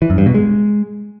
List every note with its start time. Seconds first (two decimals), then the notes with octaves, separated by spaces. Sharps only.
0.02 E3
0.10 F#2
0.18 G2
0.26 B2
0.34 G#3